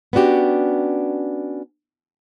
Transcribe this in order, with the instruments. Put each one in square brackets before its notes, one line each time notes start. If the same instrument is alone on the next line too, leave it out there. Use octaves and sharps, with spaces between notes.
[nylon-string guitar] B3 C#4 D4 F#4 G4